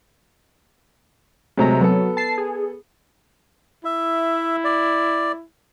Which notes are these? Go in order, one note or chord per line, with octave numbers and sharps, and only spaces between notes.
C3 F#3 G#3 A3 A#5
F#3 B3 A4
A5 C7
G#4
E4 E5
D5